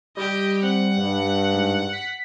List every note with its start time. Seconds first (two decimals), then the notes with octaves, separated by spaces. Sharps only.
0.17 G3 G4 D#5
0.63 C4 F#5
0.98 G2
1.54 G#2
1.93 B6